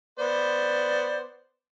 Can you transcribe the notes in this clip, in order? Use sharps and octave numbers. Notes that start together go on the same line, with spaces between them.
B3 C5 D5